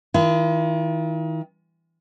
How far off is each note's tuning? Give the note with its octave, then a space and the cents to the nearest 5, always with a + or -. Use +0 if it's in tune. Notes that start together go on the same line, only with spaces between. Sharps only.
D#3 +35 F4 -45